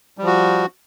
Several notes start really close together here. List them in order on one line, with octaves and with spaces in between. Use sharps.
G3 F3 F#4